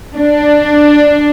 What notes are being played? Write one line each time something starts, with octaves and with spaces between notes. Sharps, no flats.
D4